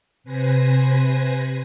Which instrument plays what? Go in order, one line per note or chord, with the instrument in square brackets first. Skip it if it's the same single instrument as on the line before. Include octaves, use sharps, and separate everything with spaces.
[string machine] C3 B4 C5 G#5 A#6